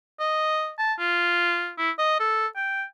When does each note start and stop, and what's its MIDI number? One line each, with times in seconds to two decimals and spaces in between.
0.20 0.71 75
0.78 0.93 81
0.99 1.72 65
1.78 1.91 64
1.99 2.19 75
2.20 2.47 69
2.56 2.84 79